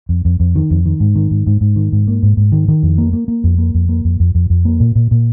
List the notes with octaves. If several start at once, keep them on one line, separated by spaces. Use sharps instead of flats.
F2
F2
F2
D#3
F2
D#3
G#2
D#3
G#2
G#2
G#2
D#3
G#2
A#3
G#2
G#2
D#3
D#3
F2
A#3
A#3
A#3
F2
A#3
F2
A#3
F2
F2
F2
F2
A#3
A#2
A#2
A#2